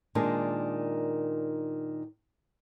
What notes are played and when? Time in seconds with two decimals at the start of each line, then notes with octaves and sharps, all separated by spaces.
0.15 A#2 D#3 G#3 D4